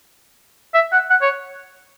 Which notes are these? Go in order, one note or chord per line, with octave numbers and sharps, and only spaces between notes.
E5
F#5
F#5
C#5